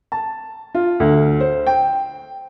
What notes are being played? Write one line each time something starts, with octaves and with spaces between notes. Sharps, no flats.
A5
F4
D2
C5
G5